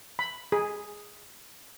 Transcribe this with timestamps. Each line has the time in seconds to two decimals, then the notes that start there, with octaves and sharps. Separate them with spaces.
0.19 B5
0.52 G#4